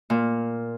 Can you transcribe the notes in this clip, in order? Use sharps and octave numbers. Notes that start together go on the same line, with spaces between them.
A#2